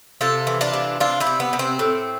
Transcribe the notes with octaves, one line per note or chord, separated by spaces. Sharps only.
C3 F4 A4
E3
D4 F4
C3
C3 D4 F4
C4 E4
C3
B3
C3
C4
A2